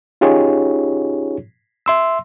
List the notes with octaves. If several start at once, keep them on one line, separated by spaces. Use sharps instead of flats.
C#4 D#4 F4 G4 G#4 C#5
E5 C6 E6